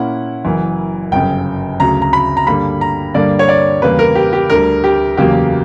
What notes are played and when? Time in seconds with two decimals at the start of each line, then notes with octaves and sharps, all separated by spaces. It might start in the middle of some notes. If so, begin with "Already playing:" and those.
Already playing: A#2 A#3 C#4 E4 F#5
0.45 F#1 F#2 E3
1.12 G1 F#2 C#3 G5
1.80 D2 C#3 F#3 A#5
2.02 A#5
2.13 B5
2.37 A#5
2.47 G2 D3 G3 A#3 B5
2.81 A#5
3.14 G2 D3 G3 A#3 D5
3.39 C#5
3.49 D5
3.82 E2 C#3 G3 A#3 B4
3.99 A#4
4.15 G4
4.33 G4
4.50 D2 D3 G3 A#4
4.84 G4
5.17 F#1 E2 C#3 F#3 A#3 G4